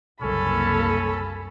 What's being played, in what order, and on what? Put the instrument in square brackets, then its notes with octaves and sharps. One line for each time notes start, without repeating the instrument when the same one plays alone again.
[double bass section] F#1 C2 A#3 [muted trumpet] C#4 [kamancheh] A4 B5